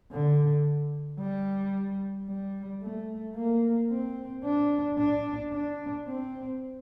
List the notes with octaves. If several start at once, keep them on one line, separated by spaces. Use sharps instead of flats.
D3
G3
G3
A3
A#3
C4
D4
D4
D4
C4